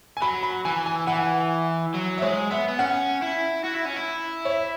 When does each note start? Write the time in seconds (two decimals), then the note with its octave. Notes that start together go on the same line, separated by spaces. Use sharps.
0.17 G#5
0.22 F#3 B5
0.43 B5
0.65 E3 G#5
0.86 G#5
1.07 E3 F#5
1.15 G#5
1.23 F#5
1.94 F#3
2.18 E5
2.22 G#3 C#5
2.51 B3 E5
2.69 B3
2.79 C#4 F#5
3.22 E4
3.64 F#4
3.75 E4
3.86 C#4
3.97 E4
4.45 C#5
4.50 E5